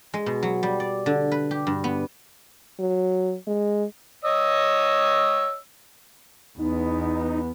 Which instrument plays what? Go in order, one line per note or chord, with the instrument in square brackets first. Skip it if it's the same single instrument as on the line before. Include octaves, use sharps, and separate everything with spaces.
[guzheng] G#3
B2
F#3
G3
D5
D3
B4
G4
G2
B3
[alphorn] F#3
G#3
[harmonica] C#5 D#5 E6
[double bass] E2 B3 [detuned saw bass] D#4